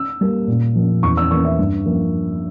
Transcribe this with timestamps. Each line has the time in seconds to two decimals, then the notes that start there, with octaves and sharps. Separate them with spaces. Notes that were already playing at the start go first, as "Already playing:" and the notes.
Already playing: E6
0.21 G3 A#3
0.48 A#2
0.75 F3 A#3
1.03 E2 C#6
1.17 E6
1.31 E3 A#3 C#6
1.45 E5
1.59 G2
1.86 F3 A#3